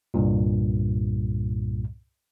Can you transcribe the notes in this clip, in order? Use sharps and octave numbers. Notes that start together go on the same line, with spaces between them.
C2 G2 A#2